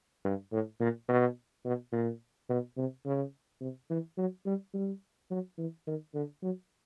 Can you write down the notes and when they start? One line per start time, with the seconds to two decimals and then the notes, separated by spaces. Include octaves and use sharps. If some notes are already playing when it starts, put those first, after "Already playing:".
0.25 G2
0.52 A2
0.80 A#2
1.09 B2
1.65 B2
1.92 A#2
2.49 B2
2.77 C3
3.06 C#3
3.61 C3
3.90 E3
4.18 F#3
4.46 G3
4.74 G3
5.31 F#3
5.58 E3
5.87 D#3
6.14 D3
6.42 F#3